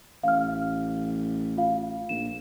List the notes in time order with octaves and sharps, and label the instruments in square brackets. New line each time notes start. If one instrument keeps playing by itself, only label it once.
[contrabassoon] A1 [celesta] F5 F6
[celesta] F4 F5
[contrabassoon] A#1 [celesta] E7